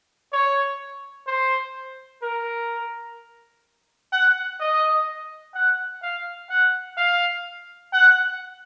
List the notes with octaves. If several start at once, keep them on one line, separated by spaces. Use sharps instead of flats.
C#5
C5
A#4
F#5
D#5
F#5
F5
F#5
F5
F#5